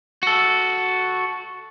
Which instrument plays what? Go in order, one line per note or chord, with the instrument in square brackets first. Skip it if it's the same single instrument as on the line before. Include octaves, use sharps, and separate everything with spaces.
[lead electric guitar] F#4 A4